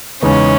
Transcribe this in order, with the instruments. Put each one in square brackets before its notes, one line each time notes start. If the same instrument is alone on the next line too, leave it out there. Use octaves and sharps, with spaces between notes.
[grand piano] E2 C#3 G#3 B3 D#4 [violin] C#4